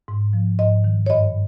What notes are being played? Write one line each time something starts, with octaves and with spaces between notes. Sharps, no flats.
G#2
F3
G#2 D#5
D#3
C#5
G2 D#5